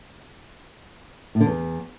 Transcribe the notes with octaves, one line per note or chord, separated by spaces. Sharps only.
A2
D3
E2